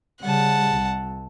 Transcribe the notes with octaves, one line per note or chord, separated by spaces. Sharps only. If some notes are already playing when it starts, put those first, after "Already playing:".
C#3 G3 F#5 A5
C2